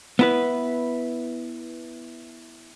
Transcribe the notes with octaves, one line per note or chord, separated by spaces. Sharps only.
B3 E4 B4